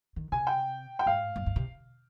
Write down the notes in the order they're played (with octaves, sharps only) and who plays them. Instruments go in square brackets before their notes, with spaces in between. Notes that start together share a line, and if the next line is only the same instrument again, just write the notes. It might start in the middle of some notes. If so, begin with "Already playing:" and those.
[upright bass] D#3
[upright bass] C3 [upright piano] G#5
[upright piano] G5
G5
[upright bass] G#2 [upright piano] F5
[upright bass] G2
G2
C3